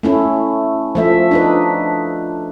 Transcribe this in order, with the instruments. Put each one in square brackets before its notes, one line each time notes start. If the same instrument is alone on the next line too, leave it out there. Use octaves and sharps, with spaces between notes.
[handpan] A3 C#4 E4
F3 A3 E5
D4 D#4 B4